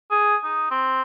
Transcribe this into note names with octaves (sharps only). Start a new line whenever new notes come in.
G#4
D#4
C4